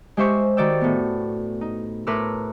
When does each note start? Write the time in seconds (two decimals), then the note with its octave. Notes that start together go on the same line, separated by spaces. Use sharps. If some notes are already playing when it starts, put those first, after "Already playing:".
0.17 G#3 G4 C5 E5 C#6 G6
0.57 D#3 F#4 D5 G5 E6
0.81 A2 B3
1.61 D#4
2.07 A2 A#4 B4 C6 D6 E6